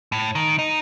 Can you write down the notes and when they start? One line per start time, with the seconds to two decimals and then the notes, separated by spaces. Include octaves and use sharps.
0.12 A2
0.35 D#3
0.59 D#4